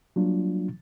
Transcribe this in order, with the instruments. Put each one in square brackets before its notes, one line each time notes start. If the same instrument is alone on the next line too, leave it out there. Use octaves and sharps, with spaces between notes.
[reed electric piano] F#3 G3 A#3 D4 F4